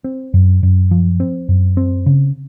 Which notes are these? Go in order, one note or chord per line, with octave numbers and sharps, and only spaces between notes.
C4
F#2
F#2
F3
C4
F#2
C4
C#3